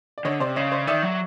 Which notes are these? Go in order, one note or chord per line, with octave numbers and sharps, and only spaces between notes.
D5
D3 C#5 D#5
C3 C5 D5
C#3 C#5 D#5
C5 D5
D#3 D5 E5
F#3